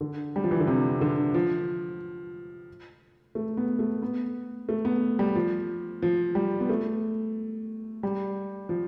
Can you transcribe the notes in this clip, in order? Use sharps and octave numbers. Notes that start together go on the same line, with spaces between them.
D3
G3
F3
E3
D3
C3
D3
F3
A3
B3
A3
B3
A3
B3
G3
F3
F3
G3
B3
A3
G3
F3